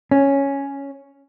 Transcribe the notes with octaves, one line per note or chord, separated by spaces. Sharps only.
C#4